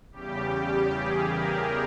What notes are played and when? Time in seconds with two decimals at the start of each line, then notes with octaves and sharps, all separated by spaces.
0.12 E2 C#3 G3 G4
0.89 G#4
1.26 A#4